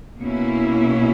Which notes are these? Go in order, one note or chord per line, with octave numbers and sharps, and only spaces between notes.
B2 A#3 C#4 E4